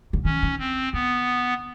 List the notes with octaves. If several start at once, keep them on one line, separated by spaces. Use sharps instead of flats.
D3
D#3 C#4
D#3
C4
D3 B3